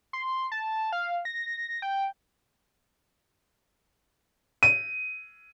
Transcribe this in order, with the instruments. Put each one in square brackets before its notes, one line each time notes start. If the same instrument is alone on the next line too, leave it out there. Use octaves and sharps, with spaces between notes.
[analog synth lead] C6
A5
F5
A#6
G5
[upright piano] D#7